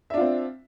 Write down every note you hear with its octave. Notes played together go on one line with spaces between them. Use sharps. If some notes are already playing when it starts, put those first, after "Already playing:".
C4 D4 F4 E5